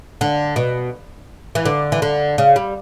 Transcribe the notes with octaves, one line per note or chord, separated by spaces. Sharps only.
D3
B2
E3
D3
E3
D3
C#3
G3